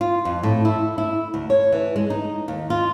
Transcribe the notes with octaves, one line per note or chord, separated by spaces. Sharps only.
F4
F2
A2
E4
E4
D2
C#5
E3
G#3
D#4
D#2
F4